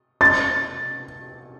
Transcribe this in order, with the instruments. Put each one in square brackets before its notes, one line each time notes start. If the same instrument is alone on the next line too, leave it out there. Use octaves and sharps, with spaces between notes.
[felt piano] A6